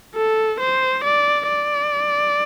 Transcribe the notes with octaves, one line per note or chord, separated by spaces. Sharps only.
A4
C5
D5
D5